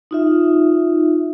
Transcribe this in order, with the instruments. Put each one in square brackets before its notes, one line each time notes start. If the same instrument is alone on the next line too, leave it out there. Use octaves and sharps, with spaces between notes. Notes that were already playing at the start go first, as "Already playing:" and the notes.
[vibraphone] D#4 F4 E5